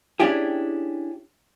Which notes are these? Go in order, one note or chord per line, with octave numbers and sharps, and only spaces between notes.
C#4 D4 E4 G4 G#4